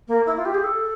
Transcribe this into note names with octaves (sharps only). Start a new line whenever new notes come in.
A#3
E4
F4
G4
G#4
A4